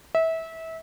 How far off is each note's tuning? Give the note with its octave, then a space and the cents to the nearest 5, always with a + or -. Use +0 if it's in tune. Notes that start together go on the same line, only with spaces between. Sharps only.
E5 -25